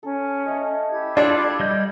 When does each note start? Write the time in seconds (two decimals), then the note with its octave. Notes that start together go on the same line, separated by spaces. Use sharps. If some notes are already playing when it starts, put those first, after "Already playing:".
0.03 C#4 A4
0.46 A3 D#5
0.89 E4 G4 G#6
1.17 G3 D4 F4 A4 D5 F5
1.60 G3 D5 D#5 G6